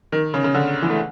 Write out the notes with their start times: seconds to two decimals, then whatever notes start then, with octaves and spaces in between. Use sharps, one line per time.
0.12 D#3
0.34 C#3
0.44 C#3
0.54 D3
0.82 E3
0.90 A3